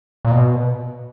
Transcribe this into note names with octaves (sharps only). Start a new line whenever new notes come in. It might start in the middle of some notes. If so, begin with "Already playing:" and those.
A#2
B2